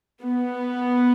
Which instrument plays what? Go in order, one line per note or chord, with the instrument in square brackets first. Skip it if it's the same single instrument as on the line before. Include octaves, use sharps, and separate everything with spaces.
[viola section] B3